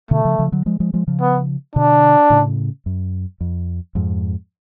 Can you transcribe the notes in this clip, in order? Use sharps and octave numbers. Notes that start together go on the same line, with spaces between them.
B2 D3 A3
C#3 F3
C#3 F3
D3 F#3
F3 G#3
F3 G#3
F3 G#3
C#3 F3
B3
B2 D3 D4
A2 C#3
F#2
F2
F2 G#2